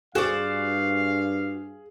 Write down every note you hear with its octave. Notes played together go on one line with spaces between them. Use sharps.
G2 F#4 G#4 C5 D5 F5